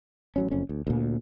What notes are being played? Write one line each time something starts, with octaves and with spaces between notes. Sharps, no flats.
A1 F#3 C#4
F#1 F2 C#4
D2
D2 A#2